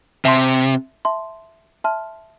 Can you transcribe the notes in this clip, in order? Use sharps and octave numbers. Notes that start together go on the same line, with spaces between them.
C3 E5 A5 C6
E5 A5 C6
E5 A5 C6 F6